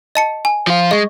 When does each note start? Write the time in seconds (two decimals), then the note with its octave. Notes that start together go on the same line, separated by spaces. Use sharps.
0.15 D#5 A5 C#7
0.45 G#5
0.67 F3 F4
0.91 G#3 D#5 C#6